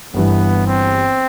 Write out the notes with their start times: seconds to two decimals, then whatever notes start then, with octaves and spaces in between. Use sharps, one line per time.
0.14 G1 G2 E3 B3
0.67 C4